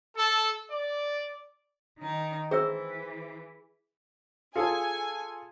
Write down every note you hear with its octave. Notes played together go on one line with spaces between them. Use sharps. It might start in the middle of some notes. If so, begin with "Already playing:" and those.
A4
D5
D#3 D#4
E3 C4 G#4 C5 E5 E6
F4 G#4 A4 G#5